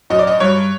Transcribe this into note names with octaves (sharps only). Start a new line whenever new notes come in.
F#2 D#5
D5
D#5
G2 C#5